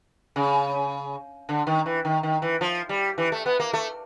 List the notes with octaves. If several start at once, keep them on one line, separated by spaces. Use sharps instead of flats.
C#3
D3
D#3
E3
D#3
D#3
E3
F3
G3
E3
A3
B3
A#3
A3